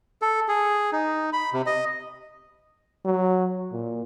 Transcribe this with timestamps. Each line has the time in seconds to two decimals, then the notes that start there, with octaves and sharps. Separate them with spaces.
0.22 A4
0.48 G#4
0.92 D#4
1.33 B5
1.53 C3
1.66 D#5
3.05 F#3
3.72 A#2